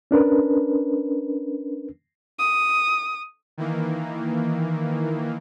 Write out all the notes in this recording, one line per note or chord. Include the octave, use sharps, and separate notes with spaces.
C#4 D4 A#4 B4
D#6
D#3 E3 A#3